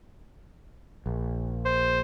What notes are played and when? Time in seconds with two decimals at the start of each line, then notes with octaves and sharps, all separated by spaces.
1.06 A#1
1.65 C5